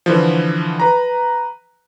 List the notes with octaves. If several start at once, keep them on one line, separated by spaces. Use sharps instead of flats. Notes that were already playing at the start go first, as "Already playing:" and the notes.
D3 E3 F3
B4 A#5